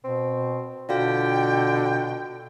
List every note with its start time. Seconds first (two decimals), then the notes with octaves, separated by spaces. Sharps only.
0.04 B2 C4
0.89 B2 D3 F4 F#4 F5 G5